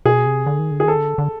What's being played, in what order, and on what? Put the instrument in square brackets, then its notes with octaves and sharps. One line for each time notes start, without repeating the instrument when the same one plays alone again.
[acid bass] B2 [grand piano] G#4
[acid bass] C3
D3
D#3
D3
[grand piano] G#4
[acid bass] D#3 [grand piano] A4
[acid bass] D3
D3